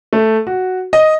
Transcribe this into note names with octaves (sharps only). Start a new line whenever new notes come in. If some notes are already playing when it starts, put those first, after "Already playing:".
A3
F#4
D#5